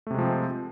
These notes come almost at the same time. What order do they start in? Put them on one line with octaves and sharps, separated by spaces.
A3 C3 G#3 F3 C4